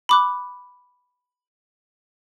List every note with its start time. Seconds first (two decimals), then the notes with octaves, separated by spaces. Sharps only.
0.09 B5 D6 F#6